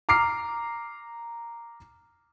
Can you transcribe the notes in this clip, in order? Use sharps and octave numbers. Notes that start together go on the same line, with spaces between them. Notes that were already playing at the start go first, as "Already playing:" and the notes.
A#5 D6 F6 C7